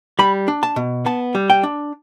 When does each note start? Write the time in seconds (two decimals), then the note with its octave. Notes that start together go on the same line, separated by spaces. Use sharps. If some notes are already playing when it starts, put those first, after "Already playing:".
0.19 G3 B5
0.48 D4
0.63 A5
0.76 B2
1.06 B3 A5
1.35 G3
1.50 G5
1.63 D4